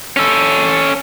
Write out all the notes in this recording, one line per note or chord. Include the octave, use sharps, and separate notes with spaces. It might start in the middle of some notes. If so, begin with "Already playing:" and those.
C#4 A4